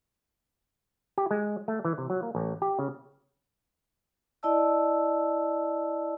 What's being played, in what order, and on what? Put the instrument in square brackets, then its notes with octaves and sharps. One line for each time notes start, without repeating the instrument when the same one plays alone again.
[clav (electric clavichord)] G4
G#3
A3
E3
C3
F#3
A#3
A1
G4
C#3
[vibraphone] E4 D5 D#5 A5 E6